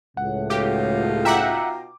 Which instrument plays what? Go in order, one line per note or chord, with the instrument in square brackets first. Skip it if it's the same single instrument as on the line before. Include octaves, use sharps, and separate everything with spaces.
[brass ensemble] C#2 A2 [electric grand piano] F#5
[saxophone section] B2 D#4 F4 [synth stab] G4
[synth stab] E5 F#5 [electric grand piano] G5 A#5 D6